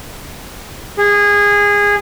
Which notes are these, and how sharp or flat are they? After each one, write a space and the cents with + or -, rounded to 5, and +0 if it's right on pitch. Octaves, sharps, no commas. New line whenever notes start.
G#4 -20